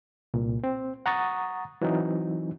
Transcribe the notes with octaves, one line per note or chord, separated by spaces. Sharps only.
C2 A#2
C4
F#5 A#5 C#6 D#6 A6
E3 F#3 C4 D#4